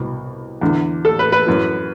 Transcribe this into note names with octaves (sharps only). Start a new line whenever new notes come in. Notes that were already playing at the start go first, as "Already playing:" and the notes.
Already playing: C2 B2
E2 D3
A4
B4
B4
F#2 E3